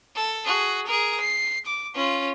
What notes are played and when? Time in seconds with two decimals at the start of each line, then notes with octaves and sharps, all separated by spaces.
0.16 A4
0.46 F#4 G#4
0.87 G#4 A#4
1.21 C7
1.66 D6
1.94 C#4 F4